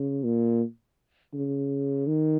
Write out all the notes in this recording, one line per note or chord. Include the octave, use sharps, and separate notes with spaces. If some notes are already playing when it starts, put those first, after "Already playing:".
Already playing: C#3
A#2
C#3
D#3